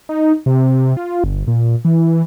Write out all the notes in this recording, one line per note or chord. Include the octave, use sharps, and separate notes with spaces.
D#4
C3
F4
G1
A#2
E3